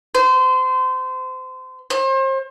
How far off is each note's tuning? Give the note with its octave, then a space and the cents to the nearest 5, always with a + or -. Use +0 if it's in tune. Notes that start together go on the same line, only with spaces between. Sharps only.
C5 -30
C5 +35